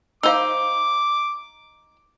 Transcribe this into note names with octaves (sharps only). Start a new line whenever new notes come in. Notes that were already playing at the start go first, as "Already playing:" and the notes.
D#4 C5 F5 D6 E6